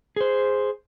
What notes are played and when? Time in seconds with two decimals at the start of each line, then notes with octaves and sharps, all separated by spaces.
0.16 G#4 C5